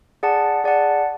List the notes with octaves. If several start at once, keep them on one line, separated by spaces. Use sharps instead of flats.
G#4 D5 F#5 A5
G#4 D5 F#5 A5